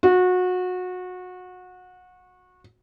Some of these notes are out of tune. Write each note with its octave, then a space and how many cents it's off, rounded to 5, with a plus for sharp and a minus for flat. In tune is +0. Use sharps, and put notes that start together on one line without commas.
F#4 -25